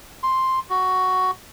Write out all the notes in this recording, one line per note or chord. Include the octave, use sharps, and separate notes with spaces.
C6
F#4